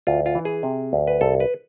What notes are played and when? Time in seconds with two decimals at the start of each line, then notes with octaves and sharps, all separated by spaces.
0.07 D2 F4
0.26 F4
0.35 E3
0.45 G#4
0.63 C3
0.93 D2
1.07 B4
1.21 C2 A4
1.40 B4